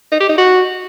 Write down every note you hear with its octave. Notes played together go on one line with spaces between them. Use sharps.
D#4
G4
D#4
F#4